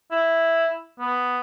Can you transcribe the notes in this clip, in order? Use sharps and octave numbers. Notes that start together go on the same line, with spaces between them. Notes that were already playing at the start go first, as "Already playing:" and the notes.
E4
B3